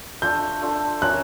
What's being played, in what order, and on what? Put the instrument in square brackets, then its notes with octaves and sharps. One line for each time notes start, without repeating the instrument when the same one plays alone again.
[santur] A3 D4 F4 A4 [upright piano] G6
[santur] A3 D4 F4 A4
[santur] A3 C#4 F4 A#4 [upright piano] F#6